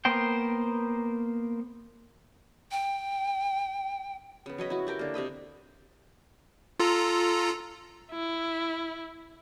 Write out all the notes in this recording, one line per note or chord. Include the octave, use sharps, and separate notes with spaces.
A#3 B3 C5 G5
G5
C#3 B3
F#3 C#5 D#5 B5
E4 F#4
F#4 G4 A#4 G5
D3 A#3
C3 C4 D#5 B5
F4 A4 A#5
E4